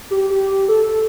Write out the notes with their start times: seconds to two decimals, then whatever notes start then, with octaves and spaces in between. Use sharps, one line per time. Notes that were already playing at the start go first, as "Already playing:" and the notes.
0.11 G4
0.30 G4
0.68 A4